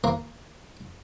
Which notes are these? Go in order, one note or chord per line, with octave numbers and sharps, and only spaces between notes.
A#3